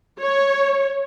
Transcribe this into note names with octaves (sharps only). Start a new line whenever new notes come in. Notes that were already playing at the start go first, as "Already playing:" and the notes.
C#5